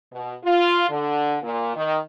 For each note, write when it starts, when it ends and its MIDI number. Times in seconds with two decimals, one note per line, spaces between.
0.12 0.35 47
0.43 0.88 65
0.89 1.37 50
1.42 1.73 46
1.75 1.98 51